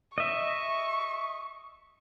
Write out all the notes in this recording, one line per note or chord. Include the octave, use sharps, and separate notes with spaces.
D#5 E5 C#6